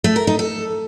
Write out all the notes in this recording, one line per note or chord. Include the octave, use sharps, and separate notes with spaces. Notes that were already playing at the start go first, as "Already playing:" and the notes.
A3
A#4
D#4
A4